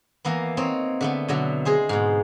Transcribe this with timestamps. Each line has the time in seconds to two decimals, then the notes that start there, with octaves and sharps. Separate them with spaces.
0.25 E3 A#3 B3
0.57 C4 D#4 C#5
1.01 D3 A3 B3
1.28 B2 D3 F#3
1.65 G#3 G#4 C5
1.89 G#2 B2